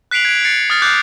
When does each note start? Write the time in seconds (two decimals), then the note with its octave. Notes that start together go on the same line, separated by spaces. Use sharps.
0.11 F#6 B6 C7 D7 F7 F#7
0.25 G#6 D7
0.44 A6 C7 C#7
0.70 D#6 F6 A6
0.82 D6 F#6 G6 A6 C7